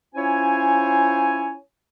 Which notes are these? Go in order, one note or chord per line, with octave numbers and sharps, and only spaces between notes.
C#4 E4 F4 C5 C#5 G#5